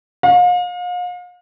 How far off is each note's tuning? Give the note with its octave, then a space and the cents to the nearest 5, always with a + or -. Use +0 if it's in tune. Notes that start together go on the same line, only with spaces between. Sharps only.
F5 +40